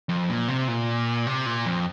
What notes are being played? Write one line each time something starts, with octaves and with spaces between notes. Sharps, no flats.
F2
A#2
C3
A#2
C3
A#2
F2